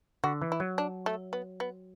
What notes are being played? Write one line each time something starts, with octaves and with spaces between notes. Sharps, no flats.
D3 F#4
E3
E4
F#3
D4
A3
B3
B3